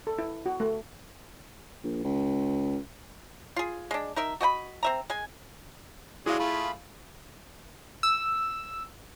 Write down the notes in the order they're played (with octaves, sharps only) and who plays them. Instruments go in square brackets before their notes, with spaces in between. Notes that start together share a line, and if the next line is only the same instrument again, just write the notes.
[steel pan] A4
E4
F#4
A3
[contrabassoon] A#1
C#2
[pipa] F4 G#4
G#3 D4
D#4 A#4 E5
F#4 D#5 G5 B5
C4 E5 A#5
G#3 G#5
[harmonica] F#3 G#3 D4 [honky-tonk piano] E4 [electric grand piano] G#4 F5
[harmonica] A3 F4 [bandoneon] B5
[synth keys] E6